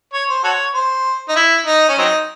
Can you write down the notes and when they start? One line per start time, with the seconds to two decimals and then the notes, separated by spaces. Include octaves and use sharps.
0.13 C#5
0.29 C5
0.44 F#4 A4 C#5
0.74 C5
1.29 D#4
1.36 E4
1.66 D#4
1.89 C#4
1.98 F#3 C4 D#4